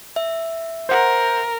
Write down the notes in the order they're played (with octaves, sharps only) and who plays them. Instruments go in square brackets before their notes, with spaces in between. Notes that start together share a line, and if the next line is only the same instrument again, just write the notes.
[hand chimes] E5
[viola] A#4 [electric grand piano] C5 F#5